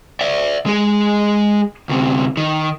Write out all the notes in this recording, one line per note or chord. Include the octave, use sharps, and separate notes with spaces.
D5 E5
G#3 G#4
D2 C3
D#3